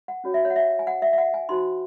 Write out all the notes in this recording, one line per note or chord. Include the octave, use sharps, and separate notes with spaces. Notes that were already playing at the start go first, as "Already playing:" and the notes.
F#5
C#4 F#4 C#5
E5
C#5
F#5
E5
G#5
F#5
E5
E5
F#5
G#5
D#4 F#4 C5 C6